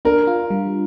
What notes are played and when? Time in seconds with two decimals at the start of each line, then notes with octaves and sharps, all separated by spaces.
0.05 D4 A#4
0.27 F4
0.50 G3